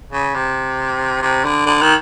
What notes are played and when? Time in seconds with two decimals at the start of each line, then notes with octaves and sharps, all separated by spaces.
0.12 C#3
0.35 C3
1.22 C3
1.44 D3
1.66 D3
1.82 D#3